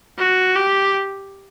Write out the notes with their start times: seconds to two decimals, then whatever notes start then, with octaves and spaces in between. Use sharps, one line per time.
0.19 F#4
0.56 G4